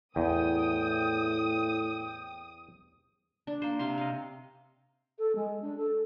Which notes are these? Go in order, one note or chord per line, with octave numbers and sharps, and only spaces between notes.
E2 A2 G5 D#6
D4
A#3 C5
C3 F5 C6
D#5 F5
A4
G#3
D4
A4